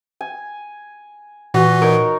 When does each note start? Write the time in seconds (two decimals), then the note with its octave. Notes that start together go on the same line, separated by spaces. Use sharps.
0.21 G#5
1.54 A#2 E3 F#4
1.82 D#4 A#4 C#5